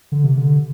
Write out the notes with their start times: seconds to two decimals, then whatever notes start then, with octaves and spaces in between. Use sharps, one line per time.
0.12 D3
0.24 C3
0.37 D3